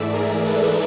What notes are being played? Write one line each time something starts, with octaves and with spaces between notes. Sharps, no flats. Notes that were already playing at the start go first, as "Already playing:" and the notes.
Already playing: G#2 E3 A3 D5 E5
G#4 A#4
A4 B4